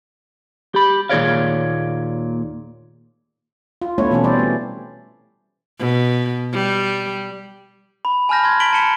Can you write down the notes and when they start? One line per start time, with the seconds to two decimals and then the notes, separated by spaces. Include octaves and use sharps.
0.75 G4 B5
1.09 D#2 A#2 G#4 C#5 D5 F5
3.82 F4
3.98 A3 B3 D4 E4 C#5
4.11 B2 E3 A3 C4 C#4 E4
4.24 E3 G3 C5 D5
4.39 A3
5.79 B2
6.53 G3
8.05 B5
8.29 G#5 A5 B5 F6 G6 A#6
8.44 B5 C6 G#6
8.60 A#5 B6 D7 F#7 G7
8.73 A5 B5 C#7 E7 G7